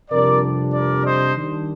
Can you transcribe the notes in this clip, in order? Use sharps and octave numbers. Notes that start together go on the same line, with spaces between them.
F2 C3 G3 D4 A#4 D5
A#4 D5
C5 D#5
D#3 G3 D4